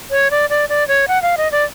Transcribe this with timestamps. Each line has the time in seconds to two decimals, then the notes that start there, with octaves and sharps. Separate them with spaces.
0.11 C#5
0.31 D5
0.50 D5
0.69 D5
0.88 C#5
1.08 F#5
1.22 F5
1.37 D#5
1.52 D5